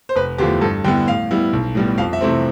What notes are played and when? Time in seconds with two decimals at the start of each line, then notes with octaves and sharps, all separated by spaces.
0.09 C5
0.16 F1 B4
0.38 E2 D3 F3 A3 G4
0.61 G2 A4
0.84 D3 G3 B3 E4 G5
1.08 A2 F5
1.31 G3 B3 E4
1.53 B1
1.75 A2 G3 B3
1.98 F2 F5
2.13 E5
2.21 C3 E3 A3 C4